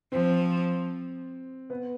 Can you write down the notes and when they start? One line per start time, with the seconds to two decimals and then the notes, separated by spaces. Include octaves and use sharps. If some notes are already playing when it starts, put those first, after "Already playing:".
0.12 F3 C4
1.70 B3